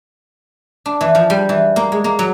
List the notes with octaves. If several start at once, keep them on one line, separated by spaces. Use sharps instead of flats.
D4
E3
F3
G3
E3
A#3
G#3
A#3
F#3